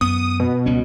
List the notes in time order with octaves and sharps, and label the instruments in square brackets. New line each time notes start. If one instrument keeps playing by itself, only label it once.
[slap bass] F#2 B3 [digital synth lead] D#6
[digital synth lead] B2
[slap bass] C#2 G3 C#4